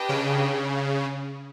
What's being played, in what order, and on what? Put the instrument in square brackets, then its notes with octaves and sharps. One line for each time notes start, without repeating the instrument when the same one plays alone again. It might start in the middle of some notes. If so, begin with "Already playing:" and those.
Already playing: [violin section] D4 G4 B4 D#5 G5
[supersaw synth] C#3